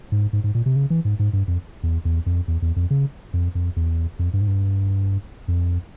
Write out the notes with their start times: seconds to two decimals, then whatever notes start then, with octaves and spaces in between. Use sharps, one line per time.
0.12 G#2
0.33 G#2
0.44 G#2
0.55 A#2
0.66 C3
0.76 C#3
0.90 E3
1.05 G#2
1.19 G#2
1.33 G2
1.48 F2
1.83 E2
2.05 E2
2.26 F2
2.48 E2
2.62 E2
2.76 F2
2.90 C#3
3.33 F2
3.55 F2
3.76 E2
4.19 F2
4.33 G2
4.41 G#2
4.47 G2
5.48 F2